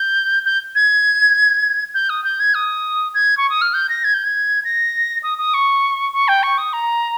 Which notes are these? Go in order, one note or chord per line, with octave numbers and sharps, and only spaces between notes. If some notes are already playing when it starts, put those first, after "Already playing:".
Already playing: G6
G6
G#6
G6
D#6
G6
G#6
D#6
G#6
C#6
D#6
F6
G6
A#6
G#6
G6
G#6
A#6
D#6
D#6
C#6
C#6
G5
C#6
D#6
A#5